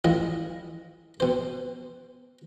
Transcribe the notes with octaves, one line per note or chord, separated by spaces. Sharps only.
A1 E4 F4 D#5
B2 C5